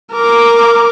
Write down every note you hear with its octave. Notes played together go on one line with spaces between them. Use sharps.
A#4 D6